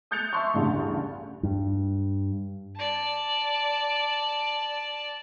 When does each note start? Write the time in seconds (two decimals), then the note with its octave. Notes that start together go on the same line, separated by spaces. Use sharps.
0.11 D#6 F#6 G6 A6 C#7 F7
0.33 E5 A5 C6 C#6
0.54 A1 D2 G2 C#3
1.43 G2
2.76 D5 A5